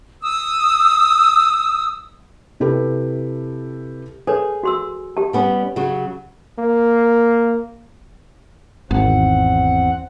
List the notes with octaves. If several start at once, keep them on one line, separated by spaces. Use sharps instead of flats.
D#6 E6
C3 E4 G4 A4 B4
G#4 A4 B4 C#5
F#4 C6 E6
G4 A5
G3 B3 C#4
C#3 F#3 F#4
A#3
G#1 E2 C4 F#5